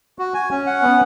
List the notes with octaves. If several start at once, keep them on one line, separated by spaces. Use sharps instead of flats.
F#4
G#5
C#4
F#5
B3